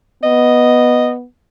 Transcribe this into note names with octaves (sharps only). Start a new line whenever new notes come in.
B3 D#5